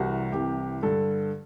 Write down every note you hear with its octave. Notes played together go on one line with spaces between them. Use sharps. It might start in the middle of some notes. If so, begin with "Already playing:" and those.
Already playing: C2 C3 E3 F#4
C2 C3 E3 G4
G2 D3 A4